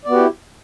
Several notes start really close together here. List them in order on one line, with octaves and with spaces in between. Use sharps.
D5 B3 F#4 G4 E4